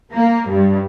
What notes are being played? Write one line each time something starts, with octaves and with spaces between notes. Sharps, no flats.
A#3
G2